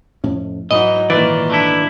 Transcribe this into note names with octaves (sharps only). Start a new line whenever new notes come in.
F2 A2 C#4
G#2 E3 F#3 D#4 D#5
A#2 D#3 E3 D5
A3 D4 E4